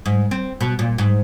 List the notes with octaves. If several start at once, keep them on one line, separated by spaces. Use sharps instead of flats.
G#2
C4
B2
A#2
G#2